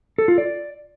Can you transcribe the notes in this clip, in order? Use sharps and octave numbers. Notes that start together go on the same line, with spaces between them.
A4
F4
D5